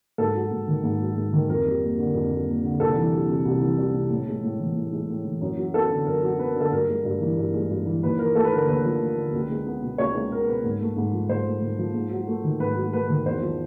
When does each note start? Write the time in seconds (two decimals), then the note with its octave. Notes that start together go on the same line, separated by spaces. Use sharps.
0.18 G#2 A4
0.35 F#3
0.52 G#2
0.68 D#3
0.84 G#2
1.00 F#3
1.16 G#2
1.33 D#3
1.49 F2 A#4
1.66 G3
1.82 A#3
1.98 D3
2.15 F2
2.31 G3
2.47 A#3
2.63 D3
2.80 C2 A4
2.96 E3
3.13 G3
3.29 C3
3.45 C2
3.61 E3
3.78 G3
3.94 C3
4.10 A2
4.27 G#3
4.43 A2
4.60 E3
4.76 A2
4.92 G#3
5.09 A2
5.25 E3
5.41 F#2
5.57 F#3
5.74 B3 A4
5.90 D3
6.06 F#2 A#4
6.23 F#3
6.39 B3 B4
6.56 D3 A4
6.72 G2 A#4
6.88 G#3
7.05 G2
7.21 E3
7.37 G2
7.54 G#3
7.70 G2
7.86 E3
8.03 D#2 B4
8.19 F3 A#4
8.35 A3 A4
8.45 B4
8.52 D3 A#4
8.68 D#2 B4
8.84 F3
9.01 A3
9.17 D3
9.34 C#2
9.50 G#3
9.67 B3
9.82 B2
9.98 C#2 C#5
10.15 G#3 C#5
10.31 B3 A#4
10.48 B2 B4
10.64 G#2
10.81 A3
10.97 G#2
11.13 F3
11.29 G#2 C5
11.46 A3
11.62 G#2
11.79 F3
11.95 G#2
12.11 F#3
12.27 A3
12.44 D#3
12.60 G#2 B4
12.77 F#3
12.93 A3 B4
13.09 D#3
13.25 E2 C5
13.42 F3